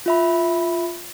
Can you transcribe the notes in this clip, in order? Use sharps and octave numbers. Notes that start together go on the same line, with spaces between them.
F4 E5 B5